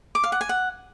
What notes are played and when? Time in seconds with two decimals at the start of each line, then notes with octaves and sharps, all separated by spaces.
0.15 D6
0.24 F5
0.32 F#5
0.41 G#5
0.49 F#5